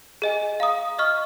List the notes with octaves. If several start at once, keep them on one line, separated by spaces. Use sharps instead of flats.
G#4 D#5 G#5
F5 A#5 D#6
D#5 C#6 F6